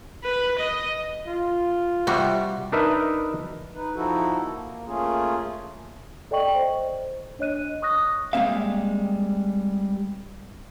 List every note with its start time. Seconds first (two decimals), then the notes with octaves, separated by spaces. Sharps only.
0.24 B4
0.59 D#5
1.27 F4
2.07 C3 G3 F#4
2.72 D4 D#4 A#4 B4 E5
3.75 D#4 B4
3.95 F3 D#4 E4 F#4 A4
4.41 A#3
4.86 A3 A#3 C#4 F4 G#4
6.31 A4 D5 D#5 G5 C#6 F#7
6.55 C5
7.39 D4 C#5 D#5 F#6 D#7
7.82 C#6 D#6 F#6 A#6
8.33 G3 G#3 A#3 C4 E5 F5